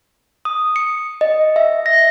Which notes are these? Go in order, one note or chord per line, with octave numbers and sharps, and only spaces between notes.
D#6
C#7
D#5
E5
A#6